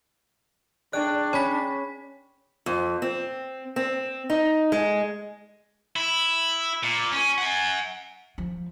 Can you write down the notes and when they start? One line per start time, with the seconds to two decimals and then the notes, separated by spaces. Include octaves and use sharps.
0.93 D4 G#4 D5 G5 C#6 F#6
1.33 C#4 C#5 B5 B6
2.66 F2
3.02 C4
3.76 C4
4.30 D#4
4.72 G#3
5.96 E4
6.83 A#2
7.12 C#4
7.38 F#5 G#5
8.38 F3